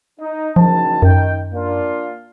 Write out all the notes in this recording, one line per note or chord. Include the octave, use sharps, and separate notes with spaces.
D#4
F#1 D#3 F3 A5
F#2 D#3 G5
A#3 D4 F4